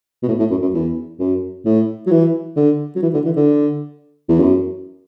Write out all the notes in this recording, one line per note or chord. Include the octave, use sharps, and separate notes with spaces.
B2
A2
A2
F#2
F#2
E2
F#2
A2
F#3
E3
D3
F#3
E3
D3
E3
D3
E2
F#2